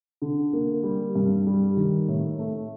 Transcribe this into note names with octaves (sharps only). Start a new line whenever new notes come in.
D3
A#3
G3
G2
G3
D#3
A2
A3